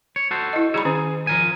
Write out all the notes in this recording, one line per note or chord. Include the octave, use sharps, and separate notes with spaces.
C#5
F#4 A4 C5
E4 D#5
G3 D#4 G#4 C#5 B5
D#3 C#4 G#4
F3 A#4 G#5